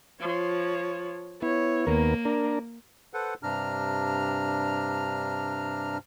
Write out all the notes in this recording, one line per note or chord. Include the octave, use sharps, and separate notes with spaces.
F3 C#5
B3 E4 C#5
D#2 A#3 B3 A#4
D4 A#4
A4 B4 C5 F#5
G2 C3 D4 A#5 F6